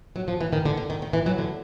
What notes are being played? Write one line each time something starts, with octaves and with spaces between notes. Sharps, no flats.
F#3
F3
E3
D#3
D3
D3
D#3
D#3
E3
F#3
D3